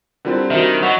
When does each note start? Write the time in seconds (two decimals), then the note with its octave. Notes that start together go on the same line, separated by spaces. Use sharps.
0.25 D3 G3 C4 E4 F4 A#4
0.50 D#3 F#4 C5 E5
0.83 F#3 D#5 F#5 B5 C#6 B6 E7